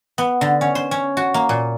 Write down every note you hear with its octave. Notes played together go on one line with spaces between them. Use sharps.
B3
D3
C#4
C5
C#4
F#4
A#3
A#2